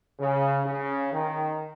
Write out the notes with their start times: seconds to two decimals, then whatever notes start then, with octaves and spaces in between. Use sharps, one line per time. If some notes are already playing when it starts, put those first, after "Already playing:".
0.19 C#3
0.66 C#3
1.12 D#3